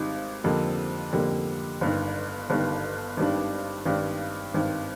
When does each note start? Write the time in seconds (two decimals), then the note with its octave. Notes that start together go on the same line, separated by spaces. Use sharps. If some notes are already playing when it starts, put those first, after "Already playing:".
Already playing: G#1 G#2 G3
0.44 F2 D3 G3 A#3
1.12 F2 D3 G3 A#3
1.81 G1 G2 D#3
2.50 G1 G2 D#3
3.17 G#1 G2 D#3 G3 D4
3.86 G#1 G2 D#3 G3 D4
4.54 G#1 G2 D#3